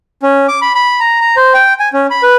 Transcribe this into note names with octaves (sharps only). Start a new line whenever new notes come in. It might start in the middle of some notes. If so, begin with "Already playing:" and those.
C#4
D6
B5
B5
A#5
A#5
C5
G5
G#5
C#4
B5
B4